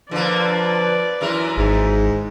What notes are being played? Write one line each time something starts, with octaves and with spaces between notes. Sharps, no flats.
D3 F3 A#3 B4 D5
F#2 E3 A#4
G#1 G#2